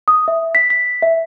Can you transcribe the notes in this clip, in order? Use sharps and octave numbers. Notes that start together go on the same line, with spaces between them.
D#6
E5
B6
B6
E5